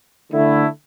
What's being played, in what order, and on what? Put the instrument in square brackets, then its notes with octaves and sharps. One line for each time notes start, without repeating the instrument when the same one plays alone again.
[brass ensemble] D3 A3 E4